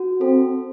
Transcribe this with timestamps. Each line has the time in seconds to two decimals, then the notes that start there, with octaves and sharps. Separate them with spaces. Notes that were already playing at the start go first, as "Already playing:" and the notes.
Already playing: F#4
0.21 C4 A4